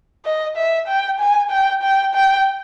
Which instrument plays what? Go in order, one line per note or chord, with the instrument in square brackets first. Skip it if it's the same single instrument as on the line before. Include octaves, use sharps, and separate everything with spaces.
[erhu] D#5
E5
G5
G#5
G5
G5
G5